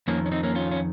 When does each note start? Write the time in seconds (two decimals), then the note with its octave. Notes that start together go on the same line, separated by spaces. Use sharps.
0.08 F2 D#3 A#3 C#4
0.26 C#4
0.32 C4 D#4
0.43 A#3 C#4
0.55 C#4 F4
0.71 C#4